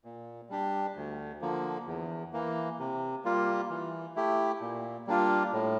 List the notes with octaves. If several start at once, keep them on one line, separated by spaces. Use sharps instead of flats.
A#2
G3 D4 G4
D2
D3 F3 A#3
E2
E3 A#3
C3
G3 A#3 F4
E3
A3 E4 G4
A#2
G3 A#3 D4 F4
A2